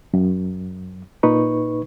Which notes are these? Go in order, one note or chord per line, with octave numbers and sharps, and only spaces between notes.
F#2
A#2 D#4 B4 C#6